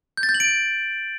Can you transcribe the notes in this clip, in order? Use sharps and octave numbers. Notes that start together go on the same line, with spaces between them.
G6
A6
G6
F#7
D7